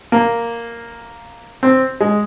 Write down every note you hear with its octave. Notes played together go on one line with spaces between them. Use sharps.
A#3
C4
G#3